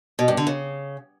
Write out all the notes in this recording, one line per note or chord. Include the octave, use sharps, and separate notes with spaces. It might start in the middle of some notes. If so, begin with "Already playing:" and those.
B2
G2
D3
C#3